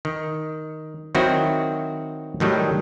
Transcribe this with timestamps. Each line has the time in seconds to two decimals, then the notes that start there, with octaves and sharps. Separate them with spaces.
0.05 D#3
1.15 D#3 F#3 C4 E4 F#4
2.40 A2 D#3 F#3 G3